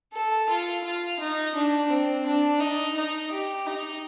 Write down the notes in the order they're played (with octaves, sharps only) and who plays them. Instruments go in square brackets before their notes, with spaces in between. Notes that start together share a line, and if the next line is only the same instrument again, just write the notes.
[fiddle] A4
F4
F4
D#4
D4
C4
D4
D#4
D#4
G4
D#4